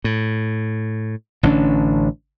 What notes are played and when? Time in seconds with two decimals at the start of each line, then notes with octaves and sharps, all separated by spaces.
0.04 A2
1.43 A1 D3 C#4 D4